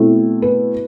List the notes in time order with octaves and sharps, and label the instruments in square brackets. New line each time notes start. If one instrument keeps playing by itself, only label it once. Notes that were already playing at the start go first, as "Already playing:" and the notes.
Already playing: [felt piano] B2 A3 C4 E4
B4